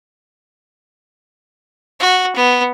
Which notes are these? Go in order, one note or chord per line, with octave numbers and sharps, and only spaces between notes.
F#4
B3